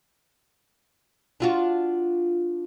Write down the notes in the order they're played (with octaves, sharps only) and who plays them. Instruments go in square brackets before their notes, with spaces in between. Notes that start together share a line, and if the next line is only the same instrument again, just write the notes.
[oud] D4 F4 F#4